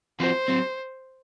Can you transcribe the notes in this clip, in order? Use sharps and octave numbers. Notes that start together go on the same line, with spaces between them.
F3 C4 F#4 C5
F#3 C4